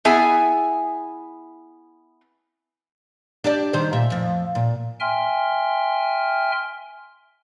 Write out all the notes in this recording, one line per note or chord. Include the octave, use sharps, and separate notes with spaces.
B3 E4 G#4 E5 G#5
D4 G4 D5
D#3 G3 C5
A#2 E5
F2 F3
A#2
E5 G5 G#5 C6 F6